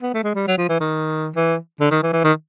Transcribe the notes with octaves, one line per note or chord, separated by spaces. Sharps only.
B3
A3
G#3
G3
F#3
F3
E3
D#3
E3
D3
D#3
E3
E3
D#3